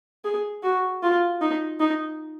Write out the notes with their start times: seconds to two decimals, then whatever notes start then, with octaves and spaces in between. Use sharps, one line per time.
0.25 G#4
0.63 F#4
1.02 F4
1.41 D#4
1.80 D#4